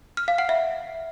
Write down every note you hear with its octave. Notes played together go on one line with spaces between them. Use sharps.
F6
F5
F#5
E5